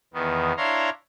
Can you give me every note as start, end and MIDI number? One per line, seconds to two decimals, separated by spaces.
0.14 0.53 40
0.14 0.53 51
0.14 0.53 59
0.57 0.89 62
0.57 0.89 64
0.57 0.89 73
0.57 0.89 77
0.57 0.89 82
0.57 0.89 84